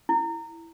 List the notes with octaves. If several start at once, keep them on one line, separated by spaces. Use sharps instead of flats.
E4